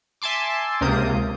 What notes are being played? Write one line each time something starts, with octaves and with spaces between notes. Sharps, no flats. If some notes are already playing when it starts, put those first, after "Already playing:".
E5 G#5 A5 C6 D6
C#2 C3 A#3 D#6 G6